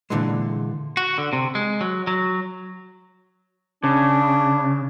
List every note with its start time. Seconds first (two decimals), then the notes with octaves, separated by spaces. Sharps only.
0.10 A#2 D3 E3 G#3
0.97 F#4
1.18 D3
1.33 C3
1.55 G#3
1.81 F#3
2.07 F#3
3.84 C#3 D4